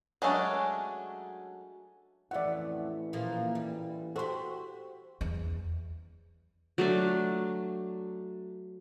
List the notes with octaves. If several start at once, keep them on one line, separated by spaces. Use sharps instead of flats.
F#3 G#3 A3 C#4 D4
A1 F2 E3 A3 E4 D5 E5 F#5
A#2 F3 A#3
G3
F#4 G4 A4 C5 C6
E2
F#3 A3 D4